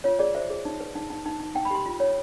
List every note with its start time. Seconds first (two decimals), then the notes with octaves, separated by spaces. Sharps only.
0.04 F4 C#5
0.19 G#4 D5
0.35 C5 E5
0.50 G#4
0.65 D#4
0.80 B4
0.95 D#4
1.10 D#4
1.26 D#4
1.40 D#4
1.55 D#4 G5
1.65 B5
1.71 G4 C6
1.86 F4
2.00 C#5